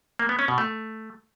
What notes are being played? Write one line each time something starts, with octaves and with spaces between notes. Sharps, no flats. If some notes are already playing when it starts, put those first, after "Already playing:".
A#3
B3
C#4
B2
A3